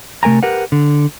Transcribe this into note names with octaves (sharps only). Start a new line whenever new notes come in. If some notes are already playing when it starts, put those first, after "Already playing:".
C3 A3 A#4 G#5 A#5
G4 A#4 B4 F#5
D3